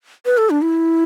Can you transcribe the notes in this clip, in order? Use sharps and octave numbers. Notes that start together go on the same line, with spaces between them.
B4
A4
D4
E4